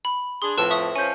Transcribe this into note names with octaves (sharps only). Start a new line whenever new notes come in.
B5
D4 G#4 C6
F2 A2 F3 B4 A5 E6
E5 C#6 D#6
F3 C#4 G#5 G6